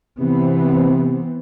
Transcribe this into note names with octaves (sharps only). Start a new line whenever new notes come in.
C3 E3 B3 C4